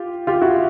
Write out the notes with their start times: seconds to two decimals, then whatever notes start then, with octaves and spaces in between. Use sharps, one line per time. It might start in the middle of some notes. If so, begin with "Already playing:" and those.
Already playing: F4 G4
0.27 F4 G4
0.41 E4 F#4